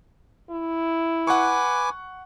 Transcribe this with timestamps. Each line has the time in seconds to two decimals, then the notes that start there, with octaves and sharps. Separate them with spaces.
0.50 E4
1.27 B4 F#5 G#5 C#6 D6